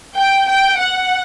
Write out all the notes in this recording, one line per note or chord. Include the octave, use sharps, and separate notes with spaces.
G5
G5
F#5